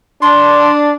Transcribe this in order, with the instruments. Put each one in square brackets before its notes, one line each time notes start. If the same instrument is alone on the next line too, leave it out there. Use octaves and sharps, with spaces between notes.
[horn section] D4 [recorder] C6